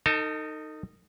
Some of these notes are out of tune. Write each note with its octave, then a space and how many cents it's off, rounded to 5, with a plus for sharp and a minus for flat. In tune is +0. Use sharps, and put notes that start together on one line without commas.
D#4 -5 A4 +45 A5 +0